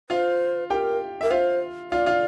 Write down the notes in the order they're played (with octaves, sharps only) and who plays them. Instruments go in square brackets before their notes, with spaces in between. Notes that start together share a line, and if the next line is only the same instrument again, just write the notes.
[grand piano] F4 F5 [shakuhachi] C5
[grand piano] G4 G5 [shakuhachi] A#4
[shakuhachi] A#4 [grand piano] E5
[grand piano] F4 F5 [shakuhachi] C5
[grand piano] F4 F5 [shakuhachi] D5
[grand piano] F4 F5